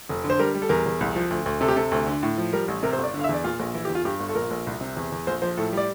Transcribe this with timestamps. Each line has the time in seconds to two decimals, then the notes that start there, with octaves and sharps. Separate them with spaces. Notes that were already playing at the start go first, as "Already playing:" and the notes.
0.09 F1
0.24 D3
0.30 C5
0.39 G3 A#4
0.54 G3
0.62 A4
0.69 E2 A#4
0.86 E2
1.01 C2
1.16 F3
1.31 D2
1.46 D2
1.61 C3 A4
1.68 G4
1.76 C3 A4
1.92 D2
2.06 D3
2.23 A2
2.38 F3
2.53 G3 A#4
2.68 A1
2.83 C3 A#4
2.93 C5
2.98 G1
3.04 D5
3.14 D3
3.19 F5
3.24 E5
3.29 E2
3.34 D5
3.44 A#2 F4
3.60 A#1
3.74 E3 E4
3.85 G4
3.89 E2
3.95 F4
4.05 G2 G4
4.20 G1
4.29 A4
4.35 A#1 A#4
4.51 A#1
4.67 C2
4.81 C3
4.97 E2
5.12 E2
5.27 A#1 C5
5.42 F3 C5
5.57 A2 A4
5.73 G3 D5